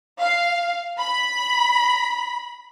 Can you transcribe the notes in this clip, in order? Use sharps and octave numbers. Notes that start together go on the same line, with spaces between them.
F5
B5